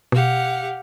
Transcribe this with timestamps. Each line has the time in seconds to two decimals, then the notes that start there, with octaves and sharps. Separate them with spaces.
0.12 B2 G4 F5 F#5